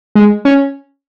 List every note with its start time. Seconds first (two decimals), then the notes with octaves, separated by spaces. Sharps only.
0.15 G#3
0.45 C#4